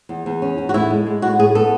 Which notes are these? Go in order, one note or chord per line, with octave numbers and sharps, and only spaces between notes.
E2
E2
C#4
E2
F#4
A2 E4
G#3
G#3
A2 F#4
A2 G#4
B3 A4